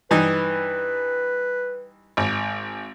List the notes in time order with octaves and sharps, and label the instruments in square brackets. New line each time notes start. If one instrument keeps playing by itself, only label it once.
[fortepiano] G2 E3 D#4 [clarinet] B4
[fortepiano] G#1